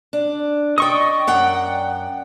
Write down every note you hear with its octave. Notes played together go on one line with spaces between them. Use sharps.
D4
D5 D#5 G5 C#6 D#6
F#2 F#5 G5